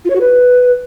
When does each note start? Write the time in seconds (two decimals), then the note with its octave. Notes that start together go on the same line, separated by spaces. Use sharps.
0.05 F4
0.10 C#5
0.15 F#4
0.20 B4